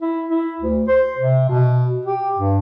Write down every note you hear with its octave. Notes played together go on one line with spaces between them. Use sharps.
E4
E4
D2
C5
C3
B2
G4
G2